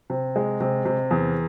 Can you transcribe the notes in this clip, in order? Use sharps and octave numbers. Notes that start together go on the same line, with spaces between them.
C3
G#3
C3
C3
E2